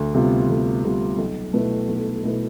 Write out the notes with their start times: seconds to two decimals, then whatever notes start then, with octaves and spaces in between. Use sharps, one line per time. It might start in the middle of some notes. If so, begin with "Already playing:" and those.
Already playing: D2
0.14 C3 G3 B3 F4
0.50 D2
0.84 C3 G3 B3 F4
1.18 B1
1.53 B2 A3 E4 B4
1.89 B1
2.23 B2 A3 E4 B4